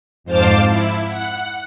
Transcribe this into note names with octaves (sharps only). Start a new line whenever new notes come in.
F2 G#2 C5 F5 A5 D6
E4
F#5